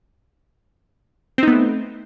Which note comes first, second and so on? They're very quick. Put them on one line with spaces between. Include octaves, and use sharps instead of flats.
C4 D#4 B3 A3